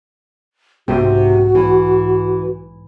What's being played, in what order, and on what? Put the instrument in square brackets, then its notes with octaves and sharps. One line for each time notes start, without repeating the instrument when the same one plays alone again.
[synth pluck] B1 G#2 [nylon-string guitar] C3 [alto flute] F#4
[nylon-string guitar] E3